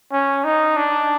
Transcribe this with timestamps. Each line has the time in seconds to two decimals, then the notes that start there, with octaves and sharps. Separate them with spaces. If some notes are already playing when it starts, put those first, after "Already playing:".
0.12 C#4
0.44 D#4
0.76 D4